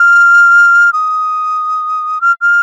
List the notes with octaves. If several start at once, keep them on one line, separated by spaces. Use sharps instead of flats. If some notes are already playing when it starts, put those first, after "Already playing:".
Already playing: F6
D#6
F6
F6